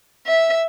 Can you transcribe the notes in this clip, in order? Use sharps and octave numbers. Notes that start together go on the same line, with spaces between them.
E5